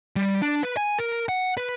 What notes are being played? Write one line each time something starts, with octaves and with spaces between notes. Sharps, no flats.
G3
D4
B4
G#5
A#4
F#5
B4